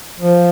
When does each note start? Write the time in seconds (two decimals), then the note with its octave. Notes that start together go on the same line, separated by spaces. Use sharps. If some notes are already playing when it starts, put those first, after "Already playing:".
0.20 F3